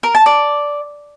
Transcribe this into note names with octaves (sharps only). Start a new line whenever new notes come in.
A#4
A5
D5